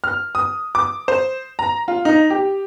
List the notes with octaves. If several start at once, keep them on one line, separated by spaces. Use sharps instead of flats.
F6
D#6
D6
C5
A#5
F4
D#4
G4